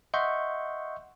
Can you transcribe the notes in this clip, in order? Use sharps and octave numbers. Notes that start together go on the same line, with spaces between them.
D#5 E5 F#5 C6 C#6 G6